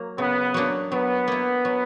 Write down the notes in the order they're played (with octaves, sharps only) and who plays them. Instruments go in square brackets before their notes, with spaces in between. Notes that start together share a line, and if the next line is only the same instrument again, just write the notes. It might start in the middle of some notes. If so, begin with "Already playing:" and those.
Already playing: [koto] F#3 A#3
[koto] C#3 [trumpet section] B3
[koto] F#3 A#3 D4
[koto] F#3 [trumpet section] B3
[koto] A#3 E4
F#3